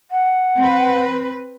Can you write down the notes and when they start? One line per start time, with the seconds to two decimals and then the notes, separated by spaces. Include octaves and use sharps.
0.10 F#5
0.59 C4 B4